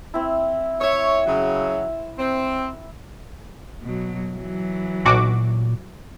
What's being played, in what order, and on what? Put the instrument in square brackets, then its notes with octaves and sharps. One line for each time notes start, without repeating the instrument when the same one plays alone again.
[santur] C4 E4
[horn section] C#5 [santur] E5 E6
[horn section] C#3 F#3
C4
[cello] B2 F#3
E3 F#3
[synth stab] B1 F#4 D6 [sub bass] A#2